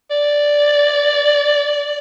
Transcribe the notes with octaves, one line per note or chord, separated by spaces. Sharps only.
D5